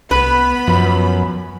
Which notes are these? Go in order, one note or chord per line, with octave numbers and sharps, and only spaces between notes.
C2 B3 B4 B5
F#2 F3